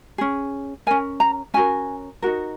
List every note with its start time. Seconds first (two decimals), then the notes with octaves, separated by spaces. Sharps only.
0.18 C#4 G#4
0.87 C#4 A#4 G#5
1.20 A#5
1.54 C#4 F#4 A#4 G#5
2.22 D#4 F#4 A#4